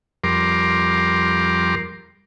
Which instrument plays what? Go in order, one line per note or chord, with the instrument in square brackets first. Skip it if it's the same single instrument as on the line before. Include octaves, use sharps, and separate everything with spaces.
[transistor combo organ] F2 G3 A#4 C6 D6